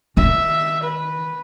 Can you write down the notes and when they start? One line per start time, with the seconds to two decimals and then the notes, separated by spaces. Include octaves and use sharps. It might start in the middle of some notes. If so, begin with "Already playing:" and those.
0.17 D#3 E5
0.83 B4